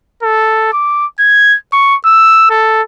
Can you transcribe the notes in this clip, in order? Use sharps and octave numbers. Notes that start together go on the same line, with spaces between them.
A4
D6
G#6
C#6
E6
A4